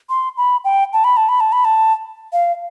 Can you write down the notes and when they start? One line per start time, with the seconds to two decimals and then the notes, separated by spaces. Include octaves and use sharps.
0.10 C6
0.37 B5
0.64 G5
0.93 A5
1.04 B5
1.17 A5
1.29 B5
1.40 A5
1.52 B5
1.65 A5
2.33 F5